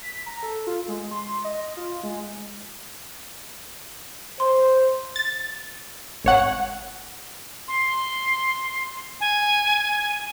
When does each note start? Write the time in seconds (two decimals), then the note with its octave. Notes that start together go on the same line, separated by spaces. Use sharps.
0.02 B6
0.26 A#5
0.43 A4
0.67 F4
0.88 G#3
1.11 C6
1.44 D#5
1.77 F4
2.03 G#3
4.40 C5 C6
5.16 A6
6.24 G#1 C#5 F#5
7.68 C6
9.20 G#5